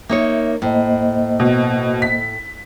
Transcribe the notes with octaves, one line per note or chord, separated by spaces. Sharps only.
A#3 D#4 C#5 E5
A2 A#3 C5 D#5
B2
B6